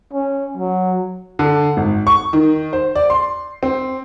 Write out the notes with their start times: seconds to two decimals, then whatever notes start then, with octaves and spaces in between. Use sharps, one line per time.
0.13 C#4
0.57 F#3
1.39 D3
1.77 G#1
2.07 C#6
2.33 D#3
2.73 C5
2.95 D5
3.10 C6
3.63 C4